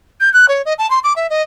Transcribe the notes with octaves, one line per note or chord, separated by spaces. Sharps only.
G6
F#6
C#5
D#5
A5
C6
D6
E5
D#5